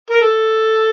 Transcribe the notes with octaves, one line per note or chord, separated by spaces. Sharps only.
A#4
A4